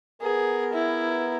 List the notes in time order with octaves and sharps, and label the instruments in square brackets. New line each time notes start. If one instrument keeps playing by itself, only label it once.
[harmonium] B3 A#4 [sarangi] G#4
[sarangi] E4